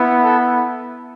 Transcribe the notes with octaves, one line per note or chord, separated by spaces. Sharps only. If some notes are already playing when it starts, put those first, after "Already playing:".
Already playing: B3 E4
A4